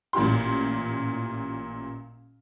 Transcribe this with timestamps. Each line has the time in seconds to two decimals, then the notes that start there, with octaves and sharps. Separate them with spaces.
0.13 A1 A#2 E4 G4 C6